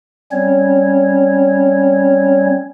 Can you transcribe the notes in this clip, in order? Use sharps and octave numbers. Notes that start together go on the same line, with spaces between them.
G3 C4 C#4 C#5